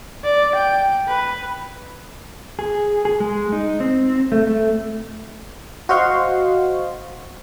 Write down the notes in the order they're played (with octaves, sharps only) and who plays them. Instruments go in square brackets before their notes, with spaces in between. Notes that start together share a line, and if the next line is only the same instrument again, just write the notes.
[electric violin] D5
G5
B4
[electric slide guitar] G#4
G#4
G#3
D#4
C4
A3
A3
[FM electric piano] F#4 C5 D#5 F5 C6 C#6